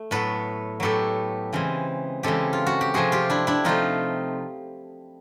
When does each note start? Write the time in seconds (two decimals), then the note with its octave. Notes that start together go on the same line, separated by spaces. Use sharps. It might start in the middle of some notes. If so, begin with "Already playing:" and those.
Already playing: A3
0.11 A2 F#3 B3 A4 B4
0.80 A2 F#3 B3 G4 A4
1.53 C#3 E3 G#3 C4
2.23 C#3 E3 G#3 C4 G4 A4
2.53 F4
2.67 F#4
2.81 G4
2.94 C3 F3 A3 C4 F#4 G#4
3.12 F4 G4
3.30 D4 E4
3.47 D4 E4
3.64 C3 F3 A3 C4 D#4 F4